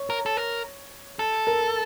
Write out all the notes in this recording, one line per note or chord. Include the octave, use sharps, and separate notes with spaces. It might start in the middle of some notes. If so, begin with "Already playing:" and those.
Already playing: C#5
A#4
A4
A#4
A4
A#4